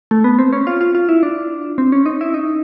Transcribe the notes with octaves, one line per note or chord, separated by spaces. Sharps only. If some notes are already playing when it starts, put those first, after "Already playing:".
A3
B3
C4
C#4
F4
F4
F4
E4
D4
C4
C#4
D#4
E4
D#4